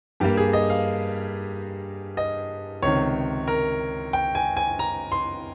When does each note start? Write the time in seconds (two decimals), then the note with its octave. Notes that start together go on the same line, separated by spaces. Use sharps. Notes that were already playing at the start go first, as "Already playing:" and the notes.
0.20 G2 G3 A#3 G4
0.37 G#4
0.53 D#5
0.70 F5
2.17 D#5
2.82 C#2 C3 D#3 C#5
3.48 A#4
4.13 G5
4.35 G#5
4.57 G#5
4.79 A#5
5.12 C6